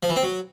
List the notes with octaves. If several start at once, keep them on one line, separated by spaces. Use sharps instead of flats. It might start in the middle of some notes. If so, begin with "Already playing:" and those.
F3
E3
C4
F#3